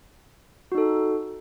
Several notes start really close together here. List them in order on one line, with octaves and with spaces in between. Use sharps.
F#4 D#4 A4